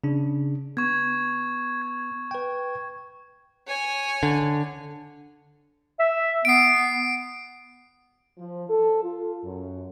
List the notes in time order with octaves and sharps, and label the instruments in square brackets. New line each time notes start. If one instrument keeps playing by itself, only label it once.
[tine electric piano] C#3 D4
[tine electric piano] B3 [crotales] C#6 G#6
[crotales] G#6
[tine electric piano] B4 G5
[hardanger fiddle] C#5 G#5
[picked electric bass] D3
[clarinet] E5
[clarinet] B3 [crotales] C7 D7
[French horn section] F3
A4
F4
F#2